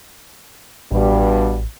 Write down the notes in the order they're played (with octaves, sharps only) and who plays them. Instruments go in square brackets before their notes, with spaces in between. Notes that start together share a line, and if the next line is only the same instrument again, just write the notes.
[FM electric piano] A1 [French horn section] G2 B2 G3